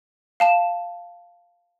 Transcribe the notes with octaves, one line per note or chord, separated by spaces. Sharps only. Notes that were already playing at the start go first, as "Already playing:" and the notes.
F5 A5 E7